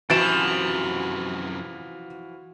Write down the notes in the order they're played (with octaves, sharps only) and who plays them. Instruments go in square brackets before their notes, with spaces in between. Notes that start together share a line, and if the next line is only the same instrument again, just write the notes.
[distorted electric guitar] F#2 C3 [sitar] E3 F3 [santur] F#4 [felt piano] A6 D7 E7